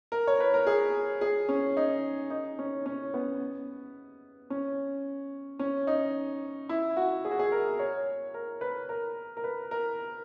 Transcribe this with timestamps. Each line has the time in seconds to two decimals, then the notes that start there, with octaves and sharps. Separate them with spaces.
0.12 A#4
0.27 C#5
0.40 B4
0.54 A#4
0.67 G#4
1.21 G#4
1.49 C#4
1.77 D#4
2.30 D#4
2.59 C#4
2.86 C#4
3.14 B3
4.50 C#4
5.59 C#4
5.87 D#4
6.69 E4
6.97 F#4
7.25 G#4
7.31 F#4
7.39 G#4
7.52 A#4
7.79 C#5
8.34 A#4
8.61 B4
8.89 A#4
9.37 A#4
9.44 B4
9.71 A#4